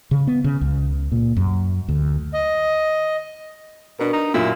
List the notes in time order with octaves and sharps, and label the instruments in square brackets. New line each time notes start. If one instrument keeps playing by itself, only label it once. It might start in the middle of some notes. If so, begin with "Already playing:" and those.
[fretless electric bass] C#3
B3
C#3
C#2
A#2
F#2
D2
[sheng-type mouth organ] D#5
[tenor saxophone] B2 [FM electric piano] D4 A#4
[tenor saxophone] D#4
[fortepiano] F#2 A#2 [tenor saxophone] E4